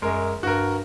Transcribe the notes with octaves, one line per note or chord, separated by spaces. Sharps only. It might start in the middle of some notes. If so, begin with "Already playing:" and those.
F#2 G#3 A#4
G2 F#4 A#4